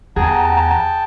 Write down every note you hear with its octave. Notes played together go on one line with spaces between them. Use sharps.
E2 G#4 F#5 G5 A5 A#5